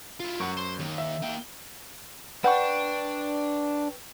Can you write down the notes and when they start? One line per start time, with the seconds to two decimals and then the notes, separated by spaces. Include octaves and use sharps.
0.20 E4 F4
0.40 F#2 A#4 F#5 C#6
0.57 C5
0.79 D#2
0.98 E5
1.22 A#3 G5
2.44 D4 B4 F#5 G5 C#6